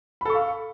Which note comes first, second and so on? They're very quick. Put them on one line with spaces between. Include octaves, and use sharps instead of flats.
B5 A4 C#6 F5